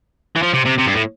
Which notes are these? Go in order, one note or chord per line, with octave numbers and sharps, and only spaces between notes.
E3
F3
C3
C3
C3
G2
A2